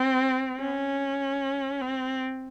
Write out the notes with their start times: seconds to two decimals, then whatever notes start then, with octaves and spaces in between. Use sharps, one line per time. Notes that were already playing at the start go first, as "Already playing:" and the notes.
Already playing: C4
0.60 C#4
1.81 C4